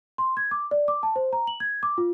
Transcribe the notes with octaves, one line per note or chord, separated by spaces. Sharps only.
C6
G#6
D6
D5
D6
A5
C5
A#5
F#7
G#6
D6
F4